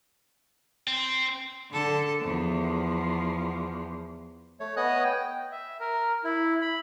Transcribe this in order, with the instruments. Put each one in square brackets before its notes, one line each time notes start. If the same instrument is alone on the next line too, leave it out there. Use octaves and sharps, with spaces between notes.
[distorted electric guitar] C4
[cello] D3 A4
E2 F3
[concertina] A3 C#5
B3 C#5 D#5 G#5 D#6 F#6
G5
[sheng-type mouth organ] E5
A#4
E4
B5